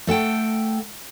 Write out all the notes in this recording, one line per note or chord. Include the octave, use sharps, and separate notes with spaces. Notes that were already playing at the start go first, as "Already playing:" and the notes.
A3 A4 F#5 G5